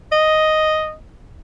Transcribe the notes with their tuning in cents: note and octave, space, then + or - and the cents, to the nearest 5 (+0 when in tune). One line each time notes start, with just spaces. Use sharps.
D#5 +0